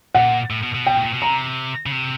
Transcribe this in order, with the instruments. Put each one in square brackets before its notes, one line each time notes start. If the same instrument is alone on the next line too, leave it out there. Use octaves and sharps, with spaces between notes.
[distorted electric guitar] A#2 [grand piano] F#5
[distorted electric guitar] A2
B2
B2
[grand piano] G5
[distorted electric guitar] A2
A#2
B2
[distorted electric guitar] C3 [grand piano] A#5
[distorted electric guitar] C#3
C3